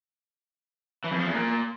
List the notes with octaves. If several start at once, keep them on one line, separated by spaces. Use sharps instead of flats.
E3
F2
F3
E2
A#2